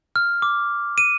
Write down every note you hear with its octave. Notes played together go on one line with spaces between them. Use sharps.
F6
D6
D#7